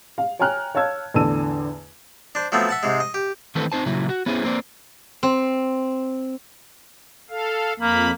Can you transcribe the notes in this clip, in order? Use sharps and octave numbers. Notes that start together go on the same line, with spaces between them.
F5
C#5 G5 G#5 A#5 F6 F#6
C#5 F5 A5 E6 G#6
E2 A2 D3 A5 E6 D#7
D4 C5
F3 F#3 A3 B3 C4
E5 F#5 A5
G#2 C3 G#3
D#5
G4
D#3 E3 A3 C4 A4 B4
C4 D#4 C5 A5
A#2 C#3 F#3 E4
F#4
B3 C#4 E4 G#4 C5
A#3 C4 C5 D5
C4
A4 F5
F2 A#3 B5